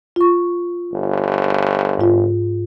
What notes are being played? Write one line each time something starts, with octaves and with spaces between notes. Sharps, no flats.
F4 C#6
G1
G#2 F4